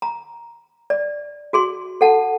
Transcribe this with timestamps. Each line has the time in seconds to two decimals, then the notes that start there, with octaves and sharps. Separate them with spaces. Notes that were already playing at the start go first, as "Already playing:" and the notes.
0.02 A#5
0.90 D5
1.53 F#4 G#4 C6
2.01 A4 F#5 A5